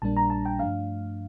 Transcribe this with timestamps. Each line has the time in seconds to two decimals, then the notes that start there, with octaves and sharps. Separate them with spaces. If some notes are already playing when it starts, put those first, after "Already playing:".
0.02 A#1 A#2 G3 A#3 D4 A5
0.17 A#5
0.30 A5
0.46 G5
0.59 G2 F3 A3 D4 F5